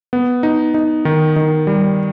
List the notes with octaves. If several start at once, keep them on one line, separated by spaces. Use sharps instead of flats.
B3
D#4
D#4
D#3
D#3
G3